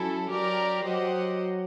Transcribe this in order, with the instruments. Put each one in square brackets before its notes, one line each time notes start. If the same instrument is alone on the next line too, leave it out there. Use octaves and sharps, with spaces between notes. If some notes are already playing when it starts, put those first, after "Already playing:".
Already playing: [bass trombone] F#3 [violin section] C#4 E4 A4
[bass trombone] F#3 [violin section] G4 A#4 D5
[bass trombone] F#3 [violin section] G4 C5 D#5 F#5